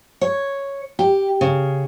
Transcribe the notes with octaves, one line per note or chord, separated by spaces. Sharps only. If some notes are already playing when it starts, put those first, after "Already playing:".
C#5
G4
C#3